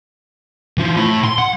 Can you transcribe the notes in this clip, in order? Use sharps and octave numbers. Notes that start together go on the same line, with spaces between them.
E3 F4
A2 B5
C6
F#5